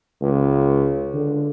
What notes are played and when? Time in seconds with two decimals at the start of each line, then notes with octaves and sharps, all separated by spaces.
0.21 C#2
1.14 D3